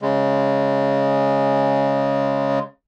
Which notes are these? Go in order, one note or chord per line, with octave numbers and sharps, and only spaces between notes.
C#3 G#3